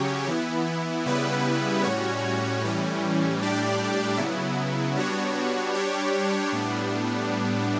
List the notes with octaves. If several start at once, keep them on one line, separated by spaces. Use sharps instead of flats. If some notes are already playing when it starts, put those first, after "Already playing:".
Already playing: C#3 F#3 C#4 G4 C#5
E3 B3 E4
C#3 G3 B3 E4 B4
A2 G3 C#4 F#4 C#5
A2 E3 G3 C#4
A2 G3 D4 G4 D5
C#3 F#3 B3 E4
G3 B3 D4 F#4 C#5
G3 D4 G4 C#5
A2 G3 B3 D4